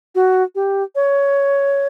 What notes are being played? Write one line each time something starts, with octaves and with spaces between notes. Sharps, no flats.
F#4
G4
C#5